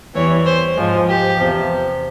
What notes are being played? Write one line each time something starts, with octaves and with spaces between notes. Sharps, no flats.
E2 E3 G3 C#5
C5
G#2 F3 G#3
G4
E2 C3 F3